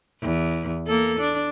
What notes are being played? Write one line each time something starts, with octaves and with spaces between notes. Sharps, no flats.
E2
A#3 A4
D4